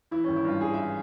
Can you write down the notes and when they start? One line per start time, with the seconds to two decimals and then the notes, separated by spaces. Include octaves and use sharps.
0.11 E3 E4
0.24 G#1 C#4
0.36 E4
0.44 G2 F4
0.61 G#1 G#4
0.74 E3 E5